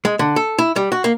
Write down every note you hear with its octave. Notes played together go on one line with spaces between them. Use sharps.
G#3
D3
A4
E4
G3
F#4
A#3